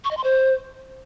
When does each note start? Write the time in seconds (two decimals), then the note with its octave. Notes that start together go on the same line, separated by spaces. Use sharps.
0.04 C#6
0.11 D#5
0.17 C6
0.24 C5